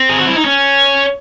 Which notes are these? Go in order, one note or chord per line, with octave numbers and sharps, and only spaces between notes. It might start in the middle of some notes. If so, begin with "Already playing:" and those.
Already playing: C4
G#4
F#4
E4
D#4
C#4